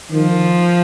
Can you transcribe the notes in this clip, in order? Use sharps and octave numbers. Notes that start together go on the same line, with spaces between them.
D#3 F3